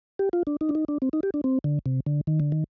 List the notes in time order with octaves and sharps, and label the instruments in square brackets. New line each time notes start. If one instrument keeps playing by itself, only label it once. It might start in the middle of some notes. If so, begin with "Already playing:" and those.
[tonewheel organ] G4
F4
D4
D#4
D4
D#4
D4
C4
D#4
G4
D4
C4
D3
C3
D3
D#3
D3
D#3